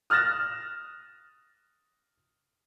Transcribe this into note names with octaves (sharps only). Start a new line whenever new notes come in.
D#6 F6 F#6 A6 A#6 E7